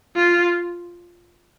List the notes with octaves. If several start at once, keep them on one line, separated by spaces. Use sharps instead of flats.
F4